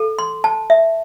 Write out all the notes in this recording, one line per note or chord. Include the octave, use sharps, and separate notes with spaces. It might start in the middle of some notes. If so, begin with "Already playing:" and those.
Already playing: A4
C6
A5
E5